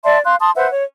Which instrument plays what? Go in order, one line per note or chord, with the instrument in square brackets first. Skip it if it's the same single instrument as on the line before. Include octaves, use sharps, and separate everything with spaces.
[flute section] D5 E5 A5 C6
F5 C6 F#6
A5 C6 D#6
B4 C5 E5 F#5
C#5